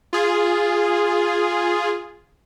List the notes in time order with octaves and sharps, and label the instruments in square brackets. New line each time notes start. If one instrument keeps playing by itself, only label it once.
[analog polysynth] F4 G#4